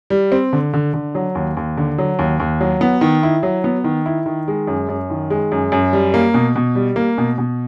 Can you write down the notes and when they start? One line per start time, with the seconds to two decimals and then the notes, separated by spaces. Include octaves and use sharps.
0.10 G3
0.32 C4
0.53 D3
0.73 D3
0.94 D3
1.15 F#3
1.35 D#2
1.57 D#2
1.77 D3
1.98 F#3
2.19 D#2
2.40 D#2
2.61 F#3
2.81 B3
3.01 D#3
3.23 E4
3.43 F#3
3.64 B3
3.84 D#3
4.06 E4
4.26 D#3
4.48 G#3
4.67 F#2
4.89 F#2
5.10 D#3
5.30 G#3
5.52 F#2
5.72 F#2
5.93 G3
6.14 A#3
6.34 B2
6.56 B2
6.75 G3
6.96 A#3
7.18 B2
7.38 B2